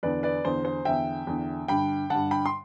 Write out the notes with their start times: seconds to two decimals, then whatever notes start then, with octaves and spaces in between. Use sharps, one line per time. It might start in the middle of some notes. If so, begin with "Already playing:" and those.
0.03 E2 D3 B4 D5
0.23 B4 D5
0.45 E2 D3 C5
0.65 C5
0.85 E2 D3 E5 G5
1.27 E2 D3
1.68 G2 D3 G5 B5
2.10 G2 D3 F#5 A5
2.31 G5 B5
2.46 C6